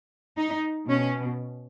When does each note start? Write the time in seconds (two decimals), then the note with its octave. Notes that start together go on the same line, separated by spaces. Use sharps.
0.38 D#4
0.88 B2 C#4